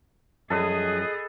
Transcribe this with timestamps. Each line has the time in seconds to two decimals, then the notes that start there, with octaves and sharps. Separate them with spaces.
0.50 F#2 F3 G3 G#4 A4 B4 D#5 D#6